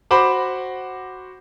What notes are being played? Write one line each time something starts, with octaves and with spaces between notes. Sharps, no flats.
F#4 C5 B5 D6